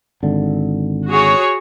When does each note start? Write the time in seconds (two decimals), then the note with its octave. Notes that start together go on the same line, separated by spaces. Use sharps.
0.23 G#1 D3
1.09 F#4 G#4 C#5